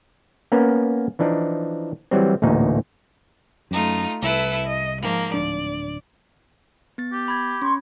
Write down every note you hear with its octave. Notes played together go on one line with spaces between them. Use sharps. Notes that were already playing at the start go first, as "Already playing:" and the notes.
A#3 B3 C#4 A#4 B4
E3 F3 D4 D#4
E3 F#3 G3 C4
A1 D2 A#2 D#4
F#2 A3 D#4 F4
C2 E4 A4 B4
D#5
G#2 F3 A#3
D1 D4 D5
B3 A6
G4
B5 G#6
C#4 C6 C#6